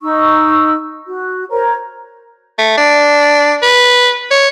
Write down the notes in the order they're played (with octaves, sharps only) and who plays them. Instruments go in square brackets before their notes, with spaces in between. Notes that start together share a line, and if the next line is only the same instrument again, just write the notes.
[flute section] D#4 C#6 E6
F#4
A#4 C5 C#5 A#5
[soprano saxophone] A3
D4
B4
C#5